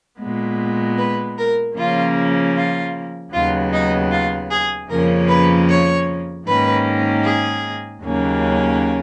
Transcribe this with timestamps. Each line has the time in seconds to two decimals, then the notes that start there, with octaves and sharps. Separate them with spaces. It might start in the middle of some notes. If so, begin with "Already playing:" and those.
0.20 A#2 G#3 B3
0.98 B4
1.38 A#4
1.77 C#3 F3 A#3 C#4 F4
2.56 F4
3.33 D#2 C#3 F#3 B3 F4
3.72 D#4
4.11 F4
4.51 G#4
4.89 F2 C#3 F3 A#3 C#4 A#4
5.28 B4
5.68 C#5
6.47 G#2 D#3 A#3 C#4 B4
7.24 G#4
8.03 D#2 C#3 F#3 A#3 C#4